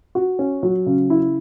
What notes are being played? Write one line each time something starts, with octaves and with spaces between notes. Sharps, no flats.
F#4
C#4
F#3
C#3
E4